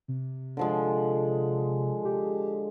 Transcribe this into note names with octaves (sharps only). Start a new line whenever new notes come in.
C3
D3 F3 G#3
G4